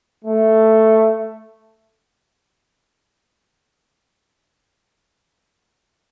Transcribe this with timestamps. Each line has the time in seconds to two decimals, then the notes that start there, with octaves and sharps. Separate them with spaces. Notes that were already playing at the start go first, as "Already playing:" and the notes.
0.25 A3